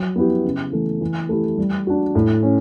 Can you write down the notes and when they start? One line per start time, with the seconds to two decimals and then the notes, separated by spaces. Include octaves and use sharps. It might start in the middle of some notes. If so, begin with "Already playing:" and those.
Already playing: F#3
0.16 B3 E4 G4
0.44 C#3
0.72 E3 A3
1.01 E3
1.29 A3 E4 G4
1.58 G3
1.87 D4 F#4
2.15 A2
2.43 C#4